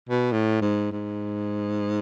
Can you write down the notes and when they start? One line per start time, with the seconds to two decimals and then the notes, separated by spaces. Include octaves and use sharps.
0.09 B2
0.32 A2
0.62 G#2
0.92 G#2